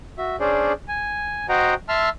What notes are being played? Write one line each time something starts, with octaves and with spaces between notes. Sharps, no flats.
F#4 E5
C#4 D4 G#4 C5 D5
G#5
F#4 C5 D#5 F#5 G5 A#5
E5 A5 C6 E6 F6